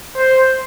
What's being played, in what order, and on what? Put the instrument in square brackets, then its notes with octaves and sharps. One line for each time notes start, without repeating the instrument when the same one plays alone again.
[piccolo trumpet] C5